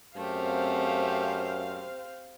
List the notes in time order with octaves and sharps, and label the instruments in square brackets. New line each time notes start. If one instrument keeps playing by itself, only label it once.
[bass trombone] F#2 [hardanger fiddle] A3 G4 [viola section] C4 C5 F5